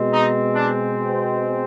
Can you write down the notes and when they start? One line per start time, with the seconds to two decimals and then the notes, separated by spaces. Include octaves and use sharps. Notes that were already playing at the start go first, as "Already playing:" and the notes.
Already playing: B2 G#3 C4
0.11 D#4
0.55 D4